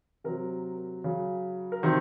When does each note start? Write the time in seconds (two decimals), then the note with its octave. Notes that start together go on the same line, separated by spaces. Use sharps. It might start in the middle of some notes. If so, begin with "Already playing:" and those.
0.24 C3 F#3 A#4
1.04 C#3 F#3
1.72 A#4
1.83 C3 D#3 F#3 C5